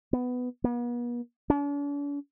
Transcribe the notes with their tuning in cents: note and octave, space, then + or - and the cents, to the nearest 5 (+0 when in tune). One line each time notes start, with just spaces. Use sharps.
B3 +10
B3 -45
D4 -45